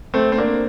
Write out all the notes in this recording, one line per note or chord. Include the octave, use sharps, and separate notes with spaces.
A3 C4
C4
A#3 D4